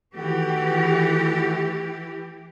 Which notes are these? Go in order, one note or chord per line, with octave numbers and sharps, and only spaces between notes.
D#3 E3 A3 F#4 G4